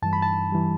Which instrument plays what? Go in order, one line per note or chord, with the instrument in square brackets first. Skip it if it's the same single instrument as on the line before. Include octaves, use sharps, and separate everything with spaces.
[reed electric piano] G2 E3 G3 A5
B5
A5
E3 G3